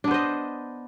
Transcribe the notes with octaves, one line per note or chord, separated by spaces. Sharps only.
B3 D4 C5 D#5